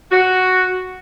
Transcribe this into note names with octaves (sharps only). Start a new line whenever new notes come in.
F#4